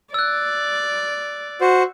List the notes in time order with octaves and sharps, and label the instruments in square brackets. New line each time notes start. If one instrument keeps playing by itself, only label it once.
[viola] D5 [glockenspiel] E6 F#6
[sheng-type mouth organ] F#4 C5